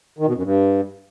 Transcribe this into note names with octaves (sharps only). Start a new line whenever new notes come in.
D#3
B2
F#2
G2